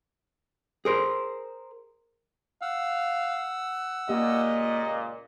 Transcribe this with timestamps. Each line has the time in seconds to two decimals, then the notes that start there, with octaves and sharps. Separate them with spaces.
0.85 G#4 A#4 C5
2.62 F5 F#5 E6
4.09 C#2 A#2 A#3 G4 D#5